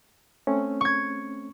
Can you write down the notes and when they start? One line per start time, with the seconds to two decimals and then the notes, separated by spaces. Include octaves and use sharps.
0.47 A3 C4 C#4
0.81 C#6 G#6